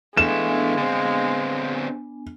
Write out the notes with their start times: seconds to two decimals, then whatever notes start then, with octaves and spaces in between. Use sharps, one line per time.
0.17 E3 G#3 A3 B3 D4 F5 G#5 E7
0.78 D3 C4